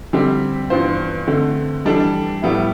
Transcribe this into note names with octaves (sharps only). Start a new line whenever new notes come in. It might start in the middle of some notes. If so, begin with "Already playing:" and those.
D3 G3 C4 G4
G2 E3 B3 F4 C5
D3 A3 C4
E3 G3 D4 A4
A2 G3 B3 E4